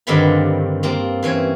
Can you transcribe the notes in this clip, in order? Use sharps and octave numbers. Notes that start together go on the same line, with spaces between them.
G2 D3 D#3 C4 F4 B5
A#3 C4 F4
E3 C4 C#4 C#5